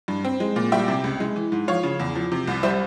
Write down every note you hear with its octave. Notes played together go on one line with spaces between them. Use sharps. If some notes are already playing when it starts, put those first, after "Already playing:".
G2
C4
G#3
A#2
G3 E5 G5
C3
C#2
G#3
E3
G#2
F3 C#5 F5
C#3
E2
F3
C3
C2
G3 C5 E5